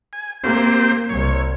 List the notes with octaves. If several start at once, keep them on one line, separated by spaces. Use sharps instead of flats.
G#5
A#3 C4 G4 C5
C2 C#5